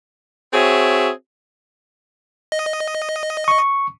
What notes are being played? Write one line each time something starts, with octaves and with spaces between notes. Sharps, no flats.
C4 F#4 G#4 C#5 E5
D#5
C#6